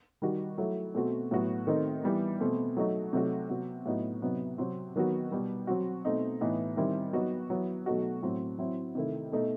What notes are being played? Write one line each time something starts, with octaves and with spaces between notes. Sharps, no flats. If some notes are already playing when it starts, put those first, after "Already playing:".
D#3 G3 D#4 F#4
F#3 A3 E4
B2 A3 C4 F#4
A2 F#3 B3 F#4
D#3 A3 C4 D#4
E3 G3 B3
B2 A3 C4
F#3 A3 D#4 F#4
C3 F#3 A3 D#4 F#4
C3 F#3 B3 F#4
A2 F#3 B3 D#4 F#4
C3 F#3 B3 D#4
C3 F#3 C4
D#3 F#3 B3 F#4
B2 G3 B3
F#3 C4 F#4
B2 A3 C4 D#4
A2 E3 B3 D#4
D#3 G3 C4 E4
F#3 B3 D#4 F#4
F#3 B3 E4
B2 F#3 A3 D#4 F#4
A2 F#3 C4
F#3 C4 E4
C3 D#3 A3 E4
B2 A3 D#4